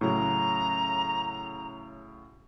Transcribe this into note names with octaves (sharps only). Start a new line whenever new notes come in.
A2 C#3 F#3 A#5